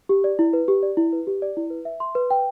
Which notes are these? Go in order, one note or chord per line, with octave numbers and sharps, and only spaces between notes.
G4
D5
E4
B4
G4
D5
E4
B4
G4
D5
E4
B4
E5
C6
B4
G5